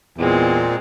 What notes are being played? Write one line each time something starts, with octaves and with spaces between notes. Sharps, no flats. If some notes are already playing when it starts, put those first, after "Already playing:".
E2 A#2 G#3 C4